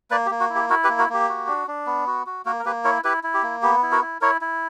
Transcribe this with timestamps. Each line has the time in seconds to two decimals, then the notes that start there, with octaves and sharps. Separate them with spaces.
0.11 A#3 B4 D5
0.26 G4
0.31 A#3
0.40 F#4
0.50 E4
0.55 G4
0.70 E4 F#4 A#4
0.84 G4 B4
0.89 A#3
0.99 F#4 A#4
1.09 A#3 G4
1.29 F#4
1.48 D4
1.68 D4
1.86 B3
2.07 F#4
2.26 F#4
2.45 A#3 F#4 A#4
2.59 A#4
2.65 A#3 G4 B4
2.84 E4 A#4 C#5
3.04 E4 G4 B4
3.24 E4
3.34 G4
3.43 A#3
3.62 B3 G4
3.83 E4
3.92 F#4 A#4
4.02 E4
4.21 E4 A#4 C#5
4.41 E4